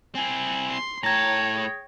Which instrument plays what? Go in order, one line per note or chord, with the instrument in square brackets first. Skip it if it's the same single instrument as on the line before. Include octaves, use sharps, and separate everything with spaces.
[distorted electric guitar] C4 E4 [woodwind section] G#5
[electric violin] C6
[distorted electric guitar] A2 A5 [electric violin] C#5 G5 [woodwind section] A#5 [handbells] G#6 A#6
[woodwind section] G#4